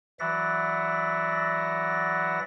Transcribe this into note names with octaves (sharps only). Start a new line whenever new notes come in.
E3 F#3 D5 E5 F#5 A#6